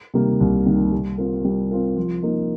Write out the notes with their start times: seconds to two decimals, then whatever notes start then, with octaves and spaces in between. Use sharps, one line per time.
0.14 C3 D#3 G3 A#3
0.40 C2
0.66 C3 D#3 G3 A#3
0.92 G3
1.18 C4 F4 A#4
1.45 G3
1.71 C4 F4 A#4
1.96 F3
2.23 A#3 D#4 A#4